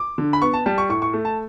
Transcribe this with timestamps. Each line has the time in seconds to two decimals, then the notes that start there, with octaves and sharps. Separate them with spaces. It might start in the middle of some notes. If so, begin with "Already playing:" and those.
Already playing: D6
0.18 D3
0.33 B5
0.42 B3 C#6
0.54 A5
0.66 G3 A5
0.78 C#6
0.89 A2 C#6
1.02 C#6
1.13 A3
1.25 A5